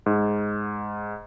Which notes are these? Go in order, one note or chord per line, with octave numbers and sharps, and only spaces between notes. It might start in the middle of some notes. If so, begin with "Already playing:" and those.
G#2